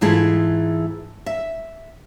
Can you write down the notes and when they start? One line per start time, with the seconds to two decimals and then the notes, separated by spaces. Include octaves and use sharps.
0.01 G#2 E3 A3 E4 F4 G#4
1.26 E5